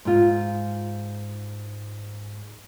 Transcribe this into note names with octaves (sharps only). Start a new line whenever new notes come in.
G#2 F4